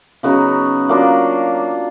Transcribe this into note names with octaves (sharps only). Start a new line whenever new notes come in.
C#3 F#3 B3 D#4
F#3 A#3 D4 F4